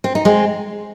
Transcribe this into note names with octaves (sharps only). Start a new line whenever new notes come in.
C4
D#4
G#3 C4